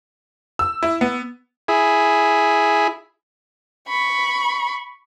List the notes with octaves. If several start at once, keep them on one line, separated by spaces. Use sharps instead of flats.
E6
E4
B3
E4 G#4
B5 C#6